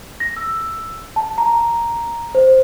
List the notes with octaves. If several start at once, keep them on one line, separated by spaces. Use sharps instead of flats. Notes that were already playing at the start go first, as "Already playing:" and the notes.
A#6
E6
A5
A#5
C5